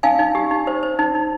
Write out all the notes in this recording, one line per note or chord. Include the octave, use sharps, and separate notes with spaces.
D#4 F5 G#5
D#4
G4
D#4
C5
C5
D#4
D#4